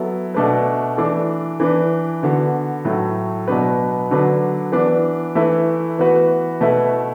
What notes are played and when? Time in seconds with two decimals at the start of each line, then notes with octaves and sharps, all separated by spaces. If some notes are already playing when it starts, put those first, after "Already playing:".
Already playing: F#3 B3 E4 A4
0.34 B2 A3 D4 B4
0.97 E3 D4 A4
1.60 E3 D4 B4
2.23 D3 B3 F#4
2.85 A2 F#3 A3
3.48 B2 F#3 B3 D4 B4
4.11 D3 F#3 D4 B4
4.72 E3 B3 D4 B4
5.35 E3 A3 E4 B4
5.98 E3 B3 F#4 B4
6.61 B2 A3 E4 B4